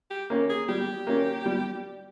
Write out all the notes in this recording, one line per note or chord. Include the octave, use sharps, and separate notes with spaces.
G4
A#3 C#4
G#4
G3 G4
A#3 C#4
G3